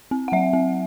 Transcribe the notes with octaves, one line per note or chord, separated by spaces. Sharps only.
C4
F#5
F#3 E5
C4